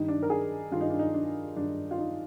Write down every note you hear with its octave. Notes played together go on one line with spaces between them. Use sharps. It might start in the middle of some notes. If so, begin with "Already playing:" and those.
Already playing: G2 D#3 D#4
D4
A#4
G#4
G2 D#3 F4
D#4
D4
D#4
D4
G2 D#3 D4
F4
D#4